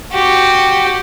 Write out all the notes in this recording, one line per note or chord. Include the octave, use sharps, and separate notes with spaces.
F#4 G4